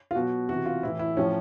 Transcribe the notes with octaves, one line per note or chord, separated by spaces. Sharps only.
F4
B2 F#3 F#4
C3 E3 F#4
F4
A2 E3 E4
E4
A2 F3 C#4